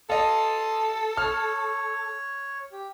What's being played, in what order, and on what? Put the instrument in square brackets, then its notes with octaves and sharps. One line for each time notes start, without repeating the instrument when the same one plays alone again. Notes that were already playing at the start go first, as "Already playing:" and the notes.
[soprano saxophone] A4 [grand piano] D#5 F5 [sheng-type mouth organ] A5 C6 D#6
[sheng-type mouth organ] C#5 [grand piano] F6
[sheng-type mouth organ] G4